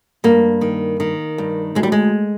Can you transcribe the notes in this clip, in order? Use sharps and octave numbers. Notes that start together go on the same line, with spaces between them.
G2 A#3
D#3
D#3
G2
D2 G#3
G3
G#3